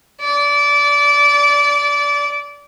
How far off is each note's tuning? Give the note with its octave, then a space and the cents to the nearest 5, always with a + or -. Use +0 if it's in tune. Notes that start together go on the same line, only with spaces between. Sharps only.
D5 -20